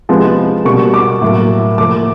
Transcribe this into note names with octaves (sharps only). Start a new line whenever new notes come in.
C3 F3 G#3 B3
B2 G3 A#3 C#6
D6
A2 F#3 A#3
A2 F3 A#3 D6